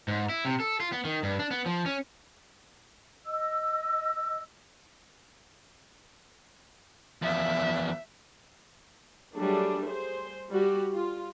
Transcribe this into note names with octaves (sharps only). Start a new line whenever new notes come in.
G#2
E4
C3
A4
F4
B3
D#3
G2
D4
B3
F3
C#4
D#5 E6
E2 F3 E5
F#3 G3 A3 D4 G#4
G#4 C5
G3 F#4 G4
F4